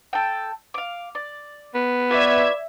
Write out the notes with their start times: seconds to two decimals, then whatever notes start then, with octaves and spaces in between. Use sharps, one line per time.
0.13 A4 G5
0.74 F5 D6
1.15 D5
1.75 B3
2.10 F4 B4 C#5 D5 E5 D6 G#6